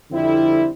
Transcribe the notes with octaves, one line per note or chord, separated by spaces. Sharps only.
F2 D3 G3 C4 E4